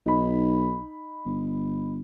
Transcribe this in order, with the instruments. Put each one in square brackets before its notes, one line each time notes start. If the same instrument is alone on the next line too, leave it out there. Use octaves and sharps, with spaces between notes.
[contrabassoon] B1 [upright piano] D#4 B5
[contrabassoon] G1